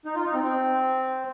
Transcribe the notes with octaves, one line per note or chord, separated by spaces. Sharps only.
D#4
F4
D#4
C4
C4